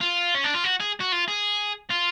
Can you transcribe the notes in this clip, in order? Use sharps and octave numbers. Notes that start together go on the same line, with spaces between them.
F4
C#4
D4
F4
F#4
G#4
F#4
F4
G#4
F4